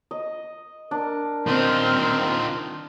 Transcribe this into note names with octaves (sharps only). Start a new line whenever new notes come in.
D#5
D4 A#4
D#3 C4 F4